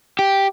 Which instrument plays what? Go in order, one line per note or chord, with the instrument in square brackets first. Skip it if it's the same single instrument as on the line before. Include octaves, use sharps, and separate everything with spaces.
[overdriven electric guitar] G4